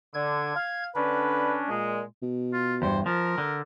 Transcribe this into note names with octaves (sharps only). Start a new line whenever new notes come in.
D3 G#6
F5
D3 C#4 D4 B4
A#2 G#3
B2
F4
E2 G2 C5
F3 A#4
D3